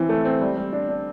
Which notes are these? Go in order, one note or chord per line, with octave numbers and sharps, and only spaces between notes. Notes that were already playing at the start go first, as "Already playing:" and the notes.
Already playing: E3 C4
A3
C4
G3
G3
D4
D4